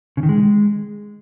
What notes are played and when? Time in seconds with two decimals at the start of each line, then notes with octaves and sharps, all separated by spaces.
0.17 C#3
0.23 D#3
0.29 G#3